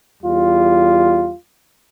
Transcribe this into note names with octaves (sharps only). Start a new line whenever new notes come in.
E2 G3 F4